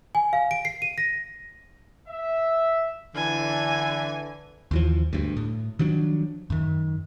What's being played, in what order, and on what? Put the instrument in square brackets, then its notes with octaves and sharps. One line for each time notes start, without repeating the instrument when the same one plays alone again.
[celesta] G#5
F5
D7
C7
D#7
A#6
[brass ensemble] E5
[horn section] D3 E3 [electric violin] G#5
[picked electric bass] D#2 E3 F3
D2 G2
A2
D#3 F3 F#3 D4
F#2 D#3